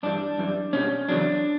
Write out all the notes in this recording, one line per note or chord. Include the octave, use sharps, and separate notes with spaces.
G2 E3 G3 D4
F#2 E3 G3
B2 G3 C#4
E2 C#3 F#3 D4